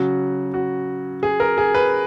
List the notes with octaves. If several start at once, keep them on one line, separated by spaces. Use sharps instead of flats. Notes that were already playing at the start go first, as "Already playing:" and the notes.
Already playing: C#3 F#3 F#4
F#4
G#4
A#4
G#4
B4